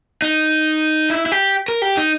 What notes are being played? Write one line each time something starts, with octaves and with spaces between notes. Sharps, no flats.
D#4
E4
E4
G4
A#4
G4
D#4